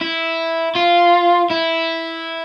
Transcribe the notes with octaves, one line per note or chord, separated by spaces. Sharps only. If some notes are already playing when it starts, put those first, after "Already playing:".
E4
F4
E4